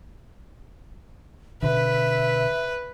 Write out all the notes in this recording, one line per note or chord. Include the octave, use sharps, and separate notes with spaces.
B2 D3 B4 E5